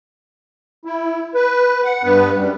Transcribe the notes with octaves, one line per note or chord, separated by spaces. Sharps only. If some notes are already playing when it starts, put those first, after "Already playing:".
E4
B4
F#5
G2 B3 B4
F#2 G3